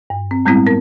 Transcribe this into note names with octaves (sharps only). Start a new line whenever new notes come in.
G2
C4
A2 G3 G#3 B3 C4 E4
B3 A#4